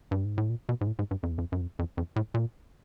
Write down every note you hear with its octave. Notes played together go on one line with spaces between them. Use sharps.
G2
G#2
A2
A#2
B2
G#2
A2
G#2
G2
F2
E2
F2
F#2
F2
F2
F2
A2
A#2